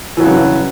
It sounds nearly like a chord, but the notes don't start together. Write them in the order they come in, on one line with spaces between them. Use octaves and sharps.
E3 F#3 C#3 G2